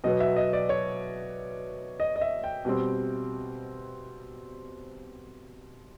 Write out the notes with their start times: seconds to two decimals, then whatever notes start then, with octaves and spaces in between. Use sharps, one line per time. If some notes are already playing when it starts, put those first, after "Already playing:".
0.04 B2 F#3 B3 D#5
0.20 E5
0.36 D#5
0.53 D5
0.69 C#5
2.00 D#5
2.16 D#5
2.21 E5
2.44 G5
2.65 B2 G3 C4